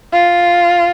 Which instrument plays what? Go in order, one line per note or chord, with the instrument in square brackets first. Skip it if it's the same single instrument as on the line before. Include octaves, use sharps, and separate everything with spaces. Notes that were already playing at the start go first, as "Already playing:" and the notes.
[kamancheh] F4